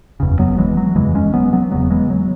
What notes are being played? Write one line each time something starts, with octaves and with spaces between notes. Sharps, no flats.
F#1 E2 C#3
F#3 B3
E3 G#3
F#3
F#1 E2 C#3 E3 G#3
G#3 C#4
F#3 B3
F#3 B3
E1 E2 C#3 F#3 B3
E3 G#3
F#3